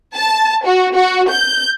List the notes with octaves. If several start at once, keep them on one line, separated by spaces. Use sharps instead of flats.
A5
F#4
F#4
G6